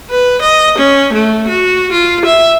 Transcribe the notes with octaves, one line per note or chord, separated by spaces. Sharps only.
B4
D#5
C#4
A3
F#4
F4
E5